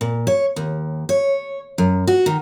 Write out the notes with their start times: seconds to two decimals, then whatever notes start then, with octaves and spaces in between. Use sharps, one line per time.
0.01 A#2
0.27 C#5
0.56 D#2
1.09 C#5
1.78 F#2
2.07 F#4
2.26 D#3